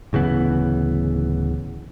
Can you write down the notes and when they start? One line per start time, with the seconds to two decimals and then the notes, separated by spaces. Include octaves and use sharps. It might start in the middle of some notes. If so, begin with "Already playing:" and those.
0.13 D1 C#3 E3 B3